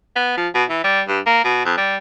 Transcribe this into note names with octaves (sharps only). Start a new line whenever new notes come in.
B3
F3
B2
E3
G3
G2
A#3
B2
F2
G3